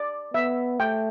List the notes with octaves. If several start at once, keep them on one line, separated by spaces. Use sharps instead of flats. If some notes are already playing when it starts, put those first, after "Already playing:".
Already playing: D5
B3 E5
A3 G5